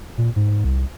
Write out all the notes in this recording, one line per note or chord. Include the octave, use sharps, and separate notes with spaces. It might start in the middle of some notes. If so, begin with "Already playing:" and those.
A#2
G#2
C2